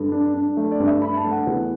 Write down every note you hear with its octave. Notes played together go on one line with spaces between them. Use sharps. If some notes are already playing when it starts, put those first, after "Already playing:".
Already playing: G2 A4
D4
D4
A3
D5
G2
E5
D4 B5
A5
A3
F#5
E2